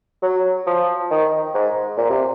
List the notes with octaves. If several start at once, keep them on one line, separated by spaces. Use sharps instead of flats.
F#3
F3
D#3
G#2
A#2
C3